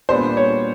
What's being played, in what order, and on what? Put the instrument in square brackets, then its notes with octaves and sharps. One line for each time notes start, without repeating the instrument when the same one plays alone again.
[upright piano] A#2 G3 B3 D4 [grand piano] C5
[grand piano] C#5